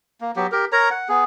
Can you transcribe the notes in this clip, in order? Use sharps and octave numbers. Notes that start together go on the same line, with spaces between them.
A#3
F#3 B3 G4
G4 A#4
A#4 C#5 A#5
F#5
B3 G#4